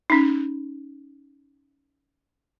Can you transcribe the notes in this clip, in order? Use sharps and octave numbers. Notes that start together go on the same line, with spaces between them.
C#4 D#4